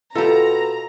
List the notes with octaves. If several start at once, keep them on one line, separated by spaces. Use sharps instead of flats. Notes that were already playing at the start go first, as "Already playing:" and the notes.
B2 F4 G4 A4 A#5